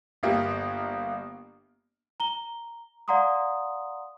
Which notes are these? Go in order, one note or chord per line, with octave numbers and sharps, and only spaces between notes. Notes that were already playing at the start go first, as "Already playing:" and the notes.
G1 A#3 G4
A#5 G7
D5 F5 F#5 A#5 C6 D#6